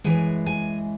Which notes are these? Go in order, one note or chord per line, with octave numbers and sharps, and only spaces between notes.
F#2 E3 G#3 G#5
G#5